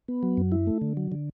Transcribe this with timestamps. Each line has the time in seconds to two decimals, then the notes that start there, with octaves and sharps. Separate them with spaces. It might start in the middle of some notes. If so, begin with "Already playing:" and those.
0.08 B3
0.23 F#3
0.37 F#2
0.52 E4
0.67 A3
0.81 D3
0.97 F#3
1.12 D3